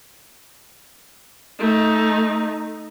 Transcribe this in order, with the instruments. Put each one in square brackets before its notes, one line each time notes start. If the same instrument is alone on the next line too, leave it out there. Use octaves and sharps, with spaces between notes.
[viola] A3 D#4